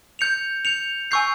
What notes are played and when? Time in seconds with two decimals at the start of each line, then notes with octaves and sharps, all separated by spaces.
0.19 G6 C#7 F7
0.65 G6 C#7 F7
1.11 G#5 C#6 E6 G6 C7